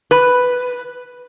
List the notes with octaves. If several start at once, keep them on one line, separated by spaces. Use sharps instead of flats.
B4